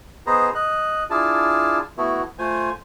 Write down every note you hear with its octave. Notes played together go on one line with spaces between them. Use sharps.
B3 D#4 G#4 B4 C5 A#5
D#5 F#6
D4 E4 F4 G#4 A5
A3 B3 E4 F#4
A3 F4 C5 G#5